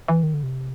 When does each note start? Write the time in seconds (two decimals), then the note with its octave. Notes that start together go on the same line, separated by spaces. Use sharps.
0.08 E3
0.23 D#3
0.34 D3
0.43 C3